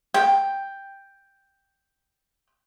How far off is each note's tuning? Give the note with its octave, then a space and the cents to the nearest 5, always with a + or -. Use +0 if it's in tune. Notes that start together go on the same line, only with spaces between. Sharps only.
G5 +5